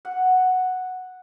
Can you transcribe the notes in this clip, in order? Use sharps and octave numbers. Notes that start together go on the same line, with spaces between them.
F#5